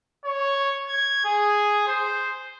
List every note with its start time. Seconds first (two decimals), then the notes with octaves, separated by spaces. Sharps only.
0.25 C#5
0.86 G#6
1.24 G#4
1.87 C5